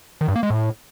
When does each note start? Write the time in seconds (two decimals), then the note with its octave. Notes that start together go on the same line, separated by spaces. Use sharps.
0.21 D#3
0.28 G2
0.36 A#3
0.43 G#3
0.50 A2